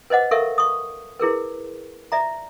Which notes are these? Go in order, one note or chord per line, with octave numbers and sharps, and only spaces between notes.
B4 C5 D#5 F#5
A4 A#4 E5 F5 C#6
C#6 D#6
E4 G#4 A#4 B4
D5 E5 A#5